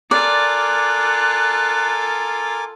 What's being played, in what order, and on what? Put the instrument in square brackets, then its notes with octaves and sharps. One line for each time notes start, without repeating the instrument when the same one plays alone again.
[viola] F4 A4 [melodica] A#4 G#5 D6 [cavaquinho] D5 [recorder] F#6